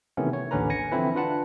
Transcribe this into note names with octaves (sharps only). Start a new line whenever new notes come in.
C3 D#3 E3 A3 B3 C#4
C#5
A1 D#2 D3 C#4 B4 A#5
G#5 A#6 C#7
D3 E3 F3 C4 E4 B4
D4 F4 B4 F#5 A5